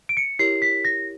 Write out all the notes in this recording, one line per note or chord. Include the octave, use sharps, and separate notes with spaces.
D7
C#7
E4 G4 A#4 C#5 C7
B6
A#6